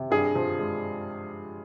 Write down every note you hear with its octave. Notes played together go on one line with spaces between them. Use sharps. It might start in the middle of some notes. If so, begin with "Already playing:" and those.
Already playing: C3
G2 G#4
F3
G#3